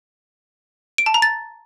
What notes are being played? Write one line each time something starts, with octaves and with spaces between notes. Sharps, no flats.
D7
A5
A#5
A6